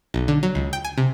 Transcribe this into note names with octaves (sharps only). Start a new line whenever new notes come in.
B1
D3
F#3
C#2
G5
G#5
C3